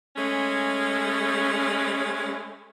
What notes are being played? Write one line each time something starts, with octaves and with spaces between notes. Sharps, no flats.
G#3 A3 C#4